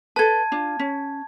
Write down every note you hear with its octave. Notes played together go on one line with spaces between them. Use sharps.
A4 B4 A5 G#6
D4 F4
C#4